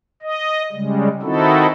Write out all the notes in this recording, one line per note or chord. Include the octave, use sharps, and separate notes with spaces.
D#5
C#3 G3 G#3
D#3 C4 D#4 E4 F#4 A4